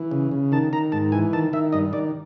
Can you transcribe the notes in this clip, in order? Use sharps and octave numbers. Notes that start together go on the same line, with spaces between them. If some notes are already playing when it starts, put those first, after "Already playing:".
Already playing: E3
C#3
C#3
D#3 A5
D#3 A#5
G#2 A5
E3 G#5
D#3 A5
D#3 E5
G2 D#5
D#3 D5